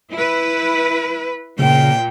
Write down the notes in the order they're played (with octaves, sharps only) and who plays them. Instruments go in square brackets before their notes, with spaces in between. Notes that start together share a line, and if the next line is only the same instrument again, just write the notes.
[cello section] E4 B4
[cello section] A#2 [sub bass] C#3 [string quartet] G5